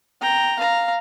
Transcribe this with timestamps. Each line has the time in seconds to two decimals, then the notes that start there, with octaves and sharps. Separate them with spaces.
0.22 G5 A#5
0.59 F5 A#5